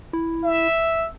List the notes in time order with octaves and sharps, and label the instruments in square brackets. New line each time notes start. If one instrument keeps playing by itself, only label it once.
[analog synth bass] E4
[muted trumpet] E5